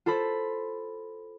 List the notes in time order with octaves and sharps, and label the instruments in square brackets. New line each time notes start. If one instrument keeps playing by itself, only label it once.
[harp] F4 A4 C5 B5